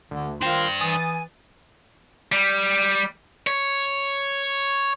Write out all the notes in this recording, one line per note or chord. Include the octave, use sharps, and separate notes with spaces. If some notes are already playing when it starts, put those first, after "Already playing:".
D2 D3
D#3 D4 F4 C5 G5 C6
E3 G#5 D#6 A6
G3
C#5